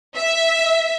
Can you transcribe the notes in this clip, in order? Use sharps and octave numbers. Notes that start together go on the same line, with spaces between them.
E5